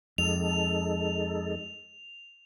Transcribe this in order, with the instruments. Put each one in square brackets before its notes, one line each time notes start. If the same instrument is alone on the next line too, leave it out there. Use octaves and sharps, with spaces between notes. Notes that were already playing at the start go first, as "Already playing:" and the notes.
[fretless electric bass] F2 [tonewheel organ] G#3 D#4 A4 [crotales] F7